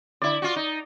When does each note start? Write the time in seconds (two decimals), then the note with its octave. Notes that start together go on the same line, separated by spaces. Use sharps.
0.22 D3 E4 D5
0.42 F4 F#4
0.56 D#4